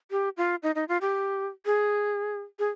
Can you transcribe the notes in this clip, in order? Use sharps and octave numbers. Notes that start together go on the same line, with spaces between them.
G4
F4
D#4
D#4
F4
G4
G#4
G#4